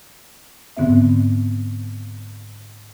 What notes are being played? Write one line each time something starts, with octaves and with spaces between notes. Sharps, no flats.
G#2 D3 B3 C4 E5